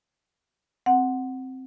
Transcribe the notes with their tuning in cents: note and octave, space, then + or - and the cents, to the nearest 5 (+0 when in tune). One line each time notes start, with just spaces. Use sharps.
C4 +0 F#5 +0